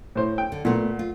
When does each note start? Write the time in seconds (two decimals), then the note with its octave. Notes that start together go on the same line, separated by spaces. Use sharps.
0.15 A2 C5
0.38 G5
0.52 D3
0.65 A#2 A3 B3
0.99 F4